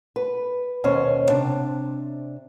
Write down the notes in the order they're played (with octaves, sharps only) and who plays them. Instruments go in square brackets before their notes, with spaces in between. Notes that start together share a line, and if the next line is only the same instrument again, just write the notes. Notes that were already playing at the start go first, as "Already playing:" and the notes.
[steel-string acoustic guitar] B4
D#2 B2 C#4 C5 C#5
C3 D4